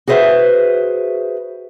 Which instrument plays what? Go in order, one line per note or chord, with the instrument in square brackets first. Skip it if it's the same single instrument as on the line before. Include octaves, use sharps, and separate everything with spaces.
[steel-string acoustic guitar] F#4 G#4 B4 C5 E5